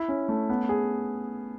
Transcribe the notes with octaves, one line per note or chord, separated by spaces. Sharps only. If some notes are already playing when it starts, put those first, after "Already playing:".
Already playing: E4
C#4
A3
B3
G#4